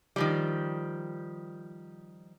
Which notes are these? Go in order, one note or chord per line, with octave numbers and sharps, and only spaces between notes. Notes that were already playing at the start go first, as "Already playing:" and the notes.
D#3 F3 G3